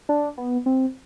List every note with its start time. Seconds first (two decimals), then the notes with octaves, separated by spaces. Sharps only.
0.09 D4
0.37 B3
0.66 C4